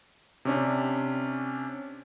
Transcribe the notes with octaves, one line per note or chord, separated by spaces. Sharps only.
C3 C#4 D4